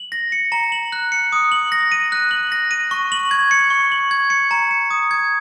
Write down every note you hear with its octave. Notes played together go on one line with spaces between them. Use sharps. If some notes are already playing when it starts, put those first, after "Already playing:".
Already playing: F#7
A#6
C#7
A#5
F#7
F#6
C#7
D#6
F#7
A#6
D#7
F#6
F#7
A#6
D#7
C#6
F#7
G#6
C#7
C#6
F#7
G#6
C#7
A#5
C#7
D#6
G#6